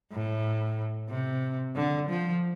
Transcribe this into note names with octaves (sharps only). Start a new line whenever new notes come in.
A2
C3
D3
F3